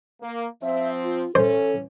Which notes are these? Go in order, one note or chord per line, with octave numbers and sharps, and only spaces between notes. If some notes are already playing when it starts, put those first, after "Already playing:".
A#3
F3 C4 E5
F4
E3 C#4 A4 C5